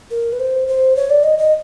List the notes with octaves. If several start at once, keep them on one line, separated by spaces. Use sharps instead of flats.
A#4
B4
C5
C5
C#5
D5
D#5
D#5